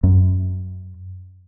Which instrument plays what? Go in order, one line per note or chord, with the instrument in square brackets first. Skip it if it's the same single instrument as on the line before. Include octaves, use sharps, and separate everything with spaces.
[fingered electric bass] F#2